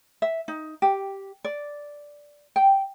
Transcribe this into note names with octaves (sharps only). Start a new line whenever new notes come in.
E5
D#4
G4
D5
G5